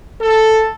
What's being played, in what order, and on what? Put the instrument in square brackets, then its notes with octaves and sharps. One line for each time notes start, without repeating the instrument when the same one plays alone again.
[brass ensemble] A4